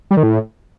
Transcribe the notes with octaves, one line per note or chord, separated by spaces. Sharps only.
G3
D#3
A2